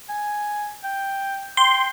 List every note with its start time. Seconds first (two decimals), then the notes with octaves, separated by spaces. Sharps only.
0.09 G#5
0.83 G5
1.57 G5 C6